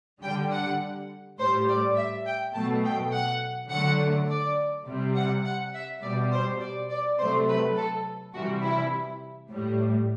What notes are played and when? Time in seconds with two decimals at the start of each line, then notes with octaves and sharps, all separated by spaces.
0.22 D3 G3 G5
0.51 F#5
1.38 A2 G3 C5
1.68 D5
1.96 E5
2.25 G5
2.54 B2 F#3 A3 A5
2.84 G5
3.13 F#5
3.70 D3 F#3 A3 F#5
4.29 D5
4.86 C3 G3
5.16 F#5
5.44 F#5
5.73 E5
6.02 B2 G3 D5
6.32 C5
6.60 D5
6.89 D5
7.18 C3 F#3 A3 C5
7.48 B4
7.77 A4
8.34 C3 E3 G3 F#4
8.63 E4
9.50 A2 G3